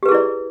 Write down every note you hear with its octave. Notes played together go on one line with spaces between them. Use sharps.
E4 G4 G#4 B4 D5